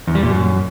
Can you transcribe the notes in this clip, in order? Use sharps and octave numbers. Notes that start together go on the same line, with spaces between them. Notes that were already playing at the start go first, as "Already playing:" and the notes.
E2
G3
A#2
F#2